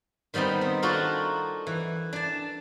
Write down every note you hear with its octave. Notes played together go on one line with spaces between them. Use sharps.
D#3 G3 B3 C4 D#4
B3
D4 D#4 F4 F#4 A4 A#4
E3
D4 A5